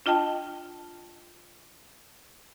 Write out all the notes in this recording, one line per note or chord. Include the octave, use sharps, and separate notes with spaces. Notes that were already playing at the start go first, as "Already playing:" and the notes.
D4 F4 D#5 G5 A5